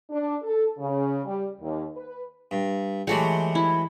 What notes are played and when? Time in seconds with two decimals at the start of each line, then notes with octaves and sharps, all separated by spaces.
0.11 D4
0.43 A4
0.79 C#3
1.26 G3
1.61 D#2
1.96 B4
2.51 G2
3.07 E3 F#3 G#3 A3 G4 F#5
3.55 E4